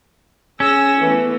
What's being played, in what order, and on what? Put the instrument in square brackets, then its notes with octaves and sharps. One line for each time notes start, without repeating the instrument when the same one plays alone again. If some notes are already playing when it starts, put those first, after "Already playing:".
[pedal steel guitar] C#4 [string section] G#4 E6 A#6
[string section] E3 A3 B3